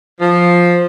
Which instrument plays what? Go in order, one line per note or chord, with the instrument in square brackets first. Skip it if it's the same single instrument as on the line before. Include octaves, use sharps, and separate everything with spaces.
[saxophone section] F3